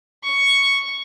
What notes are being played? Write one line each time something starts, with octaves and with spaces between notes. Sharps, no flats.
C#6